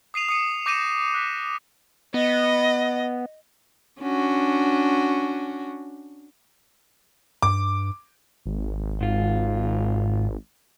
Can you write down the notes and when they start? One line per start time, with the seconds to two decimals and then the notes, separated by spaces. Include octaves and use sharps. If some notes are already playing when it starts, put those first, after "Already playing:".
0.14 D#6 C7 D#7 F7
0.29 D#6 C#7 D#7
0.66 D6 G6 A#6 C#7 D#7 E7
1.14 F#6 B6
2.14 B3 D#5
4.00 C#4 D4 F#4
7.42 G2 D6
8.45 G#1
9.01 G#2 F4